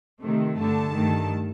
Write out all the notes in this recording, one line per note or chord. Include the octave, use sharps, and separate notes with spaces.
C3 D#3 A3
G2 D3 A3 A5
G2 D#3 A3